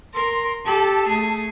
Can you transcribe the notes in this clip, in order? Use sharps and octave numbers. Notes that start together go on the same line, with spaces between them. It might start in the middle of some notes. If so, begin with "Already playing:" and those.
A#4 C6
G4 A4 A5
A3 G#4